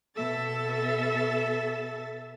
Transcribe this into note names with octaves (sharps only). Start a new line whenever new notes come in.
B2 A4 E5 A6